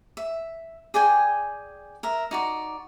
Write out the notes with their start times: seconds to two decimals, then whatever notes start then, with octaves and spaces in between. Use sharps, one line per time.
0.17 E5
0.94 G#4 D5 G5 G#5
2.03 A#4 E5
2.31 D#4 F#4 D5